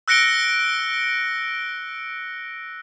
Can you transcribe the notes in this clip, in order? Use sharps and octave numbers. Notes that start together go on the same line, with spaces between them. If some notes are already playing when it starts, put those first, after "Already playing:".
E6 F#6 A#6 C#7 D7 G7